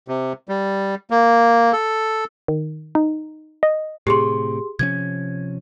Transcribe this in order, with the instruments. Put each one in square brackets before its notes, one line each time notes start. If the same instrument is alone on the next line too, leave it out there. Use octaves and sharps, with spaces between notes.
[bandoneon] C3
G3
A#3
A4
[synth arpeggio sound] D#3
D#4
D#5
[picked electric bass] A2 C3 [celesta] G4 G#4 C6
[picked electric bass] C3 F3 C#4 [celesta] G#6